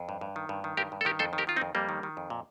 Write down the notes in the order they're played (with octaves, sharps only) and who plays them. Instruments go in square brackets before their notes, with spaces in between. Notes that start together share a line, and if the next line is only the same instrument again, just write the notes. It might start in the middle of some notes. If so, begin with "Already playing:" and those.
Already playing: [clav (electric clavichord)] F2
G2
G2
D#3
G2
D#3
G2 G4 A#4
G2
A4
D#3 G4 A#4
F2 A4 C5
D#3
G4 A#4
D#3 F4
C4 D#4
F2
F2 G3 A#3
D#3
D#3
F2
A#2